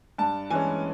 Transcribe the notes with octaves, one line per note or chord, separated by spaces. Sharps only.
G2 A5
E3 G#3 C#4 G#5